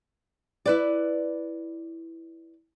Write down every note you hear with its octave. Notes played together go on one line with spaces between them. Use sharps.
E4 B4 D5